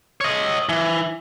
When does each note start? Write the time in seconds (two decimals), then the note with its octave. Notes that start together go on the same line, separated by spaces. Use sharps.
0.21 C#5 D#5
0.69 E3